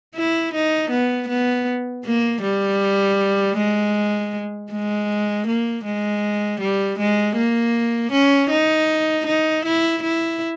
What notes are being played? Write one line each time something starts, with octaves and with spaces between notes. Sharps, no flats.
E4
D#4
B3
B3
A#3
G3
G#3
G#3
A#3
G#3
G3
G#3
A#3
C#4
D#4
D#4
E4
E4